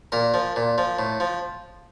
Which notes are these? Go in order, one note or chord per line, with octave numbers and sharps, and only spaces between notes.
A#2 A#4
F3
A#2
F3
A2
F3